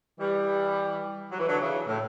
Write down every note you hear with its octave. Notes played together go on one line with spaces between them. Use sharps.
E3 G3
F#3
E3
D3 F#3
C#3 E3
A2